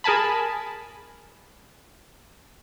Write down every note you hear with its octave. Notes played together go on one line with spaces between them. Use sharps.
G#4 A#4 G#5 A5 B5